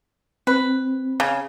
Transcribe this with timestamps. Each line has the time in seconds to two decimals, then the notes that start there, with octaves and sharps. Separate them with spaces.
0.47 C4 B4
1.20 C#3